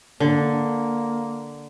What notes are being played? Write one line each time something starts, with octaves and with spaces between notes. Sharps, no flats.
D3 A#3